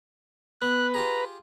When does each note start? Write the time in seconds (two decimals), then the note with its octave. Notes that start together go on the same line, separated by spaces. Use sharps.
0.62 B3 B4 F#6
0.94 F4 G4 G#4 A#5